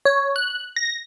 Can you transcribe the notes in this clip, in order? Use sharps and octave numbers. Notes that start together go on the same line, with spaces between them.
C#5
F#6
A#6